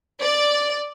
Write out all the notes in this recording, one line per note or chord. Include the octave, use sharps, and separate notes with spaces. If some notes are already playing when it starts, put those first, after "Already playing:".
D5